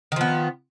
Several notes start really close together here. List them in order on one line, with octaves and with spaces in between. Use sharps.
D#3 F3 B3